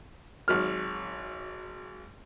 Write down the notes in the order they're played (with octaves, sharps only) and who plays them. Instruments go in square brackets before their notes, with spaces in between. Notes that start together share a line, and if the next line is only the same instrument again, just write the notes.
[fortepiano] G#1 F#3 F6